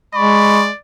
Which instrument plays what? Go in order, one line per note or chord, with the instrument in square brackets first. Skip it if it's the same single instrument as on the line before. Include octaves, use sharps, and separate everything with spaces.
[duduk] G#3 [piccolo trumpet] D5 [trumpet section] B5 C#6